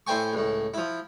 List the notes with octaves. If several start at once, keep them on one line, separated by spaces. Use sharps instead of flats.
A2 E4 C5 G5 G#5 C#6
C#2 A2
F3 E4